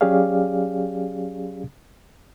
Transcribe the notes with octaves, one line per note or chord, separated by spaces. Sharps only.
F#3 C#4 G4 G#4 D5 F5